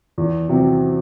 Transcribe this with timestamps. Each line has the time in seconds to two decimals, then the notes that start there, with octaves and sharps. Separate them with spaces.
0.18 E2
0.49 C3 F#3 C4